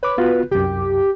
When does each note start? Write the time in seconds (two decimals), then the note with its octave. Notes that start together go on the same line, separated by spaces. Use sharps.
0.03 B4 C#5 D6
0.18 B3 F4 F#4
0.51 C2 F#2 G4